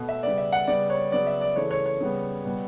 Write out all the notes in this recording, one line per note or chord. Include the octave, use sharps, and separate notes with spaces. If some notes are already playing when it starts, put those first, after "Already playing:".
Already playing: B2 A3
E5
C#3 G3 B3 D5
E5
F#5
C#3 G3 B3 D5
C#5
C#3 F#3 B3 D5
E5
D5
C#3 E3 A3 C#5
C#5
C#5
C#3 G3 B3
B2 G3 B3